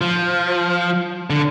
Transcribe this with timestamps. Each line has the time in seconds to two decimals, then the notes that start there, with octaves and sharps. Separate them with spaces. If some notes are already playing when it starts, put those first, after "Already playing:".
0.01 F3
1.30 D3